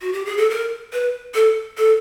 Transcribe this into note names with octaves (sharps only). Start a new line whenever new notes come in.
F#4
G4
G#4
A4
A#4
B4
A4
A4